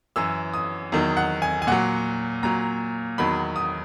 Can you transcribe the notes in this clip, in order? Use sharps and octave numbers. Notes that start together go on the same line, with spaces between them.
F#2 E3 E6
D#6
E2 D#3 F#3
F#5
G#5
G#5
A#2 F#3 F#5
A#2 F#3 A#5
E2 D#3 F#3 B5
D#6